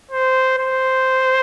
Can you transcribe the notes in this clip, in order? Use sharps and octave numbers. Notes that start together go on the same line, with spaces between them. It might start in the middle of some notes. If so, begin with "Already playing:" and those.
C5
C5